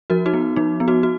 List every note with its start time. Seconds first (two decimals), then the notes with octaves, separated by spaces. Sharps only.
0.10 F3 F#4 A#4
0.26 D#4 F#4
0.33 B3
0.56 F3 D#4
0.80 B3
0.88 D#4 F#4
1.03 F#4